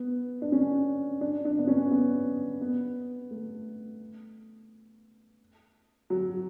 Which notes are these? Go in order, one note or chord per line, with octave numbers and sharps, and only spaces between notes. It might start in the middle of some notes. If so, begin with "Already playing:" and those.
Already playing: B3
D4
C#4
D4
D4
B3
C#4
B3
B3
A3
F#3